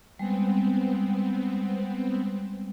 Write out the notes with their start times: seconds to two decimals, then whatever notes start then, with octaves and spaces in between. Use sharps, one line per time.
0.19 G3 G#3 B3 C4